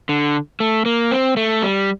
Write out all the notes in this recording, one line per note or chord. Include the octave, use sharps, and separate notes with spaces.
D3
A3
A#3
C4
A3
G3